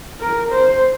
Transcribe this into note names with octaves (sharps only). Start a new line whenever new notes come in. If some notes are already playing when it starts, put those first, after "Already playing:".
A#4
C5